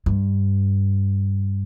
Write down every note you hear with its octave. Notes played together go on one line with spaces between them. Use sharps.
G2